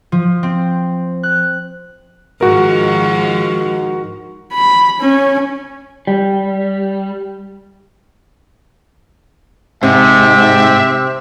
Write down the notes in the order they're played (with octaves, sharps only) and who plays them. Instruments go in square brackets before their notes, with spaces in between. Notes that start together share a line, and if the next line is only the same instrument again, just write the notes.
[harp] F3
C4
F#6
[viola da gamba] G#2 D#3 F3 [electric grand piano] F#4 A#4
[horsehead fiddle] B5
C#4
[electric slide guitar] G3
[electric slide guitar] G#2 [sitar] C3 [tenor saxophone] C4 [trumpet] E5